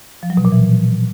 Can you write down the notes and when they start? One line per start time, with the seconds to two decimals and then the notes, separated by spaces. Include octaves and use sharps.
0.23 F3
0.30 F#3
0.37 B2
0.45 A#2
0.52 E3